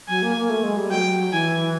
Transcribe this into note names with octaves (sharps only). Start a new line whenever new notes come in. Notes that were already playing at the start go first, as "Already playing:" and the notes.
F#3 G#5
A#3
A#3
A3
G#3
G3
F#3 G5
E3 G#5